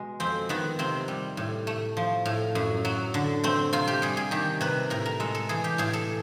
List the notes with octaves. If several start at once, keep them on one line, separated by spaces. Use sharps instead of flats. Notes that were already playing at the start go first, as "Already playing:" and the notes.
Already playing: B2 G#3
F2 C4
D#3 B3
C3 C4
G3
A2
A3
F3
A2
F#2
F#3
D3
A3 C4
C3 F4
G4
G3 G#4
G#4
D#3 G4
C3 B4
A2 A#4
A#4
G#3 A4
A4
E3 G#4
G4
A2 G#4
A4